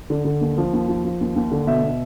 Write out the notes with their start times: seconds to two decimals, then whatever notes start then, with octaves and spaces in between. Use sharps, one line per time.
0.10 D3
0.25 D3
0.41 D#2
0.57 F3
0.73 D#2
0.88 F3
1.05 F3
1.21 D#2
1.36 D#2
1.52 D3
1.67 B2 E5
1.83 B2